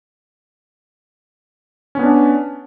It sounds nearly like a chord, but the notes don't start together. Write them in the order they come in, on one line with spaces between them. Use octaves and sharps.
C#4 B3 D4